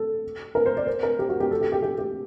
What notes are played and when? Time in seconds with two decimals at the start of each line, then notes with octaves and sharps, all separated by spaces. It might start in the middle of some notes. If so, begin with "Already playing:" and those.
Already playing: A4
0.55 A#4
0.66 C5
0.77 D5
0.87 C5
1.03 A#4
1.19 G4
1.29 F#4
1.40 G4
1.51 A4
1.61 G4
1.72 G4
1.82 G4
1.98 G4